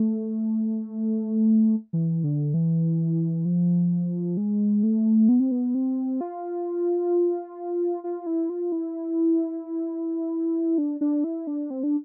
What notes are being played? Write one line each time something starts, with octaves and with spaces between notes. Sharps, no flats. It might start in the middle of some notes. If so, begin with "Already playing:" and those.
Already playing: A3
E3
D3
E3
F3
G#3
A3
B3
C4
B3
C4
F4
F4
E4
F4
E4
D4
D4
E4
D4
C4
D4